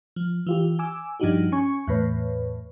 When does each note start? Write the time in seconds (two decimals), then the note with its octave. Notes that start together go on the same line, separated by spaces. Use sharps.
0.16 F3
0.47 E3 F4 G4
0.79 G#5 D6 E6
1.20 G2 F3 D4 D#4 F#4 G4
1.52 C#4 G#5 C#6 G#6
1.87 E2 A2 B4 C#5